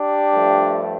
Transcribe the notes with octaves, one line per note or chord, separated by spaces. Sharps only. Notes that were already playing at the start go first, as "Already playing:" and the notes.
Already playing: D4 G4
G2 F3 A3